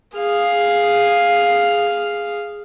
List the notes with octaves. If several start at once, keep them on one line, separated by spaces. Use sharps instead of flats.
G#4 F5